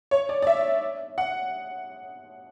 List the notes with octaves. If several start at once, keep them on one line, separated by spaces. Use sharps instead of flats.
C#5
D5
D5
E5
F#5